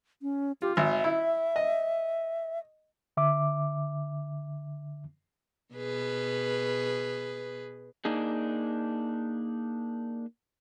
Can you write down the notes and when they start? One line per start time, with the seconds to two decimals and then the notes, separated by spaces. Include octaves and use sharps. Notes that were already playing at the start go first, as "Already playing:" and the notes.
0.22 C#4
0.62 F4 G4
0.77 G#1 E5
1.04 E4
1.56 D#5
3.17 D3 E5 D6
5.74 B2 G#4 B4
8.05 A#3 D4 D#4 G#4